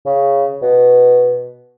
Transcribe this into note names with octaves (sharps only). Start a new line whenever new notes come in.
C#3
B2